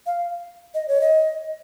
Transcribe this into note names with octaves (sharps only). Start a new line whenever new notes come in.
F5
D#5
C#5
D#5